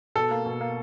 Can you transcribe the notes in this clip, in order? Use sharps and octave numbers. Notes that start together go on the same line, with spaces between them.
B2 A4
A#3
B2
A#3